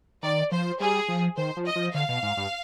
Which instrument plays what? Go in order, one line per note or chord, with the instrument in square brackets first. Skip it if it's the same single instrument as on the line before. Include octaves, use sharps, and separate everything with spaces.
[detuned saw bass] D#3 [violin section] D5
[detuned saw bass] F3 [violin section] C5
[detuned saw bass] G3 [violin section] G#4
[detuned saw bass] F3
[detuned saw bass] D#3 [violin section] C5
[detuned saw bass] F3
[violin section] D#5
[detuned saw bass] F3
[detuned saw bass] D3 [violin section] F5
[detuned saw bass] B2
G#2
G2